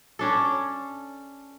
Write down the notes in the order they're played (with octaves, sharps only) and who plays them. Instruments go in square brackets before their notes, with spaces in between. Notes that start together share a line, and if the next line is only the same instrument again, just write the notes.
[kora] C#4 D4 A4